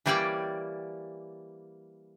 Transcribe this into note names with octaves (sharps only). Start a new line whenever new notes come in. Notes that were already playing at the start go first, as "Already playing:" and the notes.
E3 G3 A#3 C#5 D5 G5